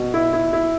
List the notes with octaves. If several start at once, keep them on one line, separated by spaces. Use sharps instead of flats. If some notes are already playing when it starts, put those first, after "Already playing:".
Already playing: B2
E4
E4
E4